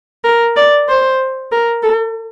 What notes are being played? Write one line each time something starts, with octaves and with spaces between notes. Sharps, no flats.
A#4
D5
C5
A#4
A4